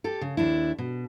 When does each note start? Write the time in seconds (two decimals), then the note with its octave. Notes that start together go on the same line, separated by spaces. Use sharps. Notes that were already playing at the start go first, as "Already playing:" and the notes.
0.04 G4 A4
0.21 C#3
0.37 D#2 D4 E4
0.78 B2